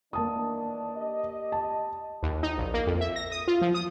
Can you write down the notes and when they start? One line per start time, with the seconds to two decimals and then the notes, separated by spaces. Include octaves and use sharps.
0.13 D#3 E3 A#3 D4 A5 D#6
0.96 G4 D5 D#5
1.52 A5
2.23 D#2
2.43 D#4
2.58 A#1
2.74 A#3
2.87 F2
3.01 E5
3.16 A#6
3.32 D#6
3.48 F4
3.61 F3
3.74 D#6